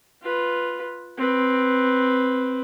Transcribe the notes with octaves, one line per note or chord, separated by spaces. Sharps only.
F4 B4
C4 B4